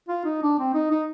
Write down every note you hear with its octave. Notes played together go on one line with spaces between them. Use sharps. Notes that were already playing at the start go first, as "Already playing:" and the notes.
F4
D#4
D4
C4
D#4
D#4